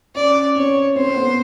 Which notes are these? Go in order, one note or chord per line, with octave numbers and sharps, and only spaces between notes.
C#4 D5
C4 C#5
C4 C5
B3